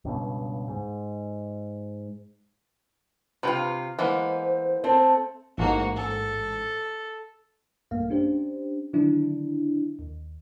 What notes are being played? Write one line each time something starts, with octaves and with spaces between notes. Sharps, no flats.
C#2 G2 B2
G#2
C3 F4 B4 G5
E3 G#3 A#3 B3 C5
A3 C4 A5
A1 G#2 A#3 F#4
A4
B1 G2 A3 A#3 F5
C#4 D4 G4 C5
D3 D#3 F#3 D4 E4
D#2